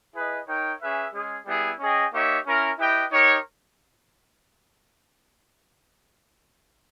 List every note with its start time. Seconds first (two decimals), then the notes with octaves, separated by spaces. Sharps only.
0.15 E4 G#4 B4 D#5
0.47 D#4 A#4 C#5 G5
0.81 C#4 G#4 B4 E5
1.13 G#3 C#4 G#4
1.46 G3 B3 E4 G#4
1.79 C#4 G#4 D#5 G5
2.12 A#3 D#4 G4 C#5 E5
2.46 C#4 E4 A#4
2.79 E4 G4 B4 D#5 G5
3.11 D#4 G4 A#4 C#5